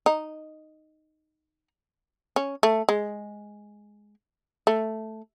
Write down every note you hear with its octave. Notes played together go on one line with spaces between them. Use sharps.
D#4
C#4
A3
G#3
A3